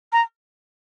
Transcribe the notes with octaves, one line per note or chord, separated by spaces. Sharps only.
A#5